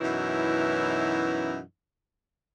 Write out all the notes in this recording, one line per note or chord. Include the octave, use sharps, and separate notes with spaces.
F#2 B2 E3 C#4 D#4 E4